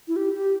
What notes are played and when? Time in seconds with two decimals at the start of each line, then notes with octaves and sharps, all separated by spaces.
0.08 E4
0.16 G4
0.34 G4